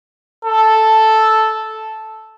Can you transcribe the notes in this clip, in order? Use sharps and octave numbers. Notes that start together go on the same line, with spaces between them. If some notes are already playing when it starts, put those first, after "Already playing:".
A4